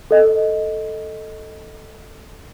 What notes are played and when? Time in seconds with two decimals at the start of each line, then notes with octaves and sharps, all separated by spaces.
0.11 A4 D#5